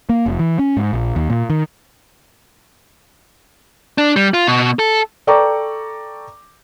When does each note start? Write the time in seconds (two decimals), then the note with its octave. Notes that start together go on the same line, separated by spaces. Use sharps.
0.09 A#3
0.26 F1
0.39 E3
0.59 C#4
0.77 G#2
0.93 A#1
1.16 D#2
1.30 A#2
1.50 D#3
3.98 D4
4.16 G3
4.34 F4
4.47 B2
4.79 A4
5.27 A4 D5 G5 A#5 C#6 D6